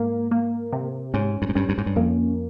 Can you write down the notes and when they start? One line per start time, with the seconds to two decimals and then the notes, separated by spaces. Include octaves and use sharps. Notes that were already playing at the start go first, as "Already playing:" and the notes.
Already playing: G#2 A#3
0.31 A#3
0.73 C3
1.14 G#2 C#4
1.42 G2
1.49 G#2
1.55 G2 C#4
1.69 G2
1.78 G#2
1.86 G2
1.96 F2 A#3